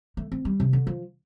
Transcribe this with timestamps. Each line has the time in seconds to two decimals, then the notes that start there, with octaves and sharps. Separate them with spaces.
0.17 A3
0.32 C4
0.45 G3
0.60 C3
0.73 D3
0.87 F3